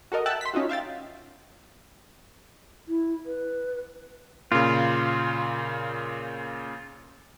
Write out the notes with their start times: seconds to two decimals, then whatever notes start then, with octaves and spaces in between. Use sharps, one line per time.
0.12 F#4 A4 A#4 D#5
0.26 E5 F#5 G5 A5 E6 F#6
0.41 C6 B6
0.54 C#4 D#4 F4 F#4
0.69 E5 F5 G5 A6
2.88 E4
3.26 B4
4.52 A#2 C#3 F4